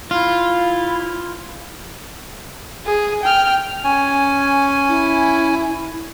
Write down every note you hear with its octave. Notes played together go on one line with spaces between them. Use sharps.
E4 F4
G#4
G5 F6
C#4 G#5
E4